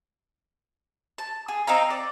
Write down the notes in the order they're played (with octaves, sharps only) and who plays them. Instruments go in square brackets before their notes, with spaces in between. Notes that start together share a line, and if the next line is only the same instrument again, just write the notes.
[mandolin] A5
G#4
C4 D#4 F5 A#5
D5